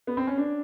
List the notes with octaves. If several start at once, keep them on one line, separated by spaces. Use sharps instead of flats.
B3
C4
C#4
D4